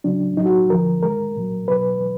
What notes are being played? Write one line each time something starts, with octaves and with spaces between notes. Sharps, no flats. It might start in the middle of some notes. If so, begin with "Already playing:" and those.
D#2 C#3 F#3 D4
A2 F#3 D#4
F#4
D2 D3 F3 A#4
D#2 D#3 G#3 A#4
C2 A#2 F#3
E2 B2 F#3 B4